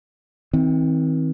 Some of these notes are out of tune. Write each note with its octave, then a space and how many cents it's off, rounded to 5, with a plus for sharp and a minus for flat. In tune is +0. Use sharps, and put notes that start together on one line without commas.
D#3 +45 C4 +0